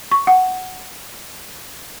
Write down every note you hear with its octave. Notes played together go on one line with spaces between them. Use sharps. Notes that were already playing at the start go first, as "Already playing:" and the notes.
C#6
F#5